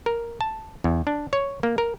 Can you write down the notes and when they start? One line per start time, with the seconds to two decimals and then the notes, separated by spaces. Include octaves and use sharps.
0.06 A#4
0.41 A5
0.84 E2
1.07 D4
1.33 C#5
1.63 A#3
1.78 A#4